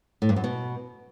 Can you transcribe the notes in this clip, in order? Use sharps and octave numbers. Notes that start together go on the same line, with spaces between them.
A2
G2
F#2
B2